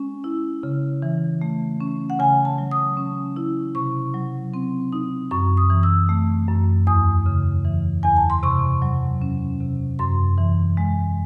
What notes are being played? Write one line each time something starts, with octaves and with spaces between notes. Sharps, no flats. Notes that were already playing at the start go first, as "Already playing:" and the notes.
Already playing: G#3 C#4
E4
C#3
E3
A3
C#4
F#5
C#3 G#5
A5
F#3
D#6
C#4
E4
C3 C#6
F#3
C4
D#4
F#2 C#6
D#6
E3
E6
A3
F#2
E2 D#6
C#3
E3
E2 G#5
A5
C6
C3 C#6
F#3
C#4
C3
F#2 C6
E3
G#3